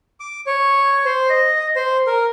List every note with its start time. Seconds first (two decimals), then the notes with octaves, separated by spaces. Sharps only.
0.20 D6
0.46 C#5
1.05 C5
1.30 D#5
1.76 C5
2.07 A#4